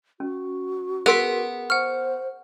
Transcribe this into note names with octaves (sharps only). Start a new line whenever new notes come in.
C#4 F#4
B3 G#4 A#4 C6 B6 D7 F7
C5 F#5 C#6 F6